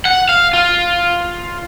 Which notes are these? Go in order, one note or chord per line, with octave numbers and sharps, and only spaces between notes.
F#5
F5
F4